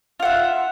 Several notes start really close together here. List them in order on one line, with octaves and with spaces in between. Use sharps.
F4 F#5 E5